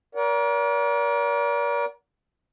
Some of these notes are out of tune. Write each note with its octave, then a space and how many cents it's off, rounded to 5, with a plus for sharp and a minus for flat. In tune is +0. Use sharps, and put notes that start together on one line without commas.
A#4 +35 D5 -40 F#5 +0